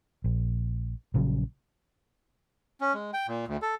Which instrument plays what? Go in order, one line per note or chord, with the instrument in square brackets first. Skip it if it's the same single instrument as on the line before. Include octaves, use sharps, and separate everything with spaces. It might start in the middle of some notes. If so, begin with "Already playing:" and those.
[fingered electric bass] A#1
A#1 C#3 F#3
[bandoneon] C#4
G#3
G5
A#2
D2
A4